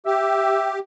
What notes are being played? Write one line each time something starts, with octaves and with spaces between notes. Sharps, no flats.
G4 E5